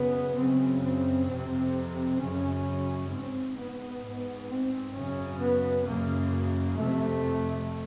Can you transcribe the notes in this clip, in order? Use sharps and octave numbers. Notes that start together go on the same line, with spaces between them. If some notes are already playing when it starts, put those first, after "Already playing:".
Already playing: F#2 C#3 B3
F#2 C#3 C4
C4
F2 C3 C4
F#2 C#3 C#4
G#2 C4
B3
G#2
C4
F#2 C#3 C#4
B3
F#2 C#3 A#3
F2 C3 A3